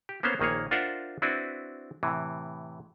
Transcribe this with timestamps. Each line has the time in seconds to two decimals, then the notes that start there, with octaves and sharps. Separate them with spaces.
0.09 G4
0.23 A#3 B3 C#4 C5 F5
0.39 A#1 D#3 A#3 G#4 C#5
0.71 D4 F4 A#4 C5 E5 F#5
1.22 C4 D4 E4 F#4 B4
2.03 A2 C3 E3